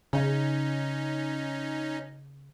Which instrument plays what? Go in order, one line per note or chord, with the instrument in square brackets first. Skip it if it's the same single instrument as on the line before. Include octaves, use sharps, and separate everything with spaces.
[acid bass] C#3 [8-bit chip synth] C#4 D#4